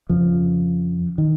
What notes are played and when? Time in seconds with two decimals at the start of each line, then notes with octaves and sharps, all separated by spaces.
0.09 F2 C#3 F3
1.18 D#3